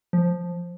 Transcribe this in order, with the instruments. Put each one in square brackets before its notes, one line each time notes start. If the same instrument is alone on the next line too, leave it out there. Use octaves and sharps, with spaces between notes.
[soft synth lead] F3